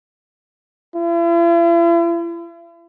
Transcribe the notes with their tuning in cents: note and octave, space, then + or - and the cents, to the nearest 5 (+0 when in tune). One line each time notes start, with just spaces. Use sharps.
E4 +45